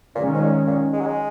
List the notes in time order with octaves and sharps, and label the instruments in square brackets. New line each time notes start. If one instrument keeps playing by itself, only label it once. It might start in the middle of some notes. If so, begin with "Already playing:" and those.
[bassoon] A#2 [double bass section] D#3 G#3 C#4
[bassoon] G#2
A#2
A#2
G#3
F#3
G#3